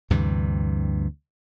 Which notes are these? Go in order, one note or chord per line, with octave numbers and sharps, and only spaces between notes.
D2 G2 C3 E3